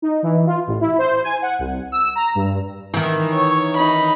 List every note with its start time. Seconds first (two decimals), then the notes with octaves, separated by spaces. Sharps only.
0.02 D#4
0.23 E3
0.46 F4
0.67 A1
0.81 E4
0.98 C5
1.24 G#5
1.42 F#5
1.59 C2
1.92 E6
2.15 A#5
2.35 G2
2.94 D#3 E3
3.34 C#5
3.78 D#4 B5